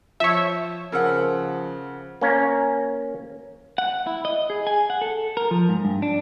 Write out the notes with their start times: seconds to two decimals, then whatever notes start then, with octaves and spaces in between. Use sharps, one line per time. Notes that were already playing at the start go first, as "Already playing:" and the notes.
0.20 F3 C#5 E5
0.92 C#3 F3 A#4 F#5 E6 F6
2.21 A#3 C#4 F5 A#5
3.78 F#5
4.07 E4
4.25 D#5
4.50 G#4
4.67 G#5
4.90 F#5
5.01 A4
5.37 A#4
5.51 F3
5.69 G#2
5.85 G2
6.02 D4